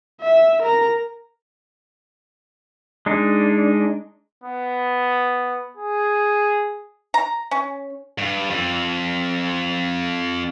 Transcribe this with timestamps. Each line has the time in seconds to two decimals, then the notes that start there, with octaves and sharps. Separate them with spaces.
0.22 E5
0.63 A#4 A#5
3.06 G#3 D4 D#4
4.44 B3
5.77 G#4
7.14 A#5
7.51 C#4
8.18 G2
8.50 F2